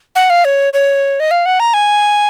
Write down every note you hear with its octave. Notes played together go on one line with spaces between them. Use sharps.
F#5
F5
C#5
C#5
D#5
F5
F#5
A#5
G#5